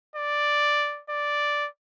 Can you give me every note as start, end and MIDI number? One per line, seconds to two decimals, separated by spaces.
0.16 1.02 74
1.10 1.68 74